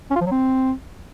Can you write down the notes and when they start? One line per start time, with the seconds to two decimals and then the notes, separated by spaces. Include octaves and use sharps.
0.11 C#4
0.16 F4
0.21 F3
0.26 F#3
0.31 C4